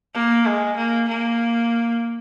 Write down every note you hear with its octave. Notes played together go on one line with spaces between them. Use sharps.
A#3
G#3
A#3
A#3